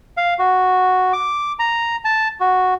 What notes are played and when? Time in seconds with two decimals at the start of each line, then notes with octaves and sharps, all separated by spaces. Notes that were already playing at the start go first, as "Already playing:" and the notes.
0.17 F5
0.39 F#4
1.13 D6
1.59 A#5
2.05 A5
2.40 F#4